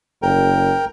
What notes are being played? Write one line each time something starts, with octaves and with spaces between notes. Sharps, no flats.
F#1 A#4 G5